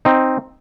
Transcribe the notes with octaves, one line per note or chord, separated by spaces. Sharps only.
C4 D#4